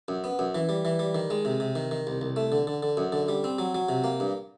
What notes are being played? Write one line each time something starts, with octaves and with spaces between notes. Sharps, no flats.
F#2
B3
F#2
E3
G3
E3
G3
D#3
G#3
C3
C3
D#3
D#3
C2
C2
A3
D3
D3
D3
F#2
D3
G3
C4
F#3
F#3
C3
A#3
G2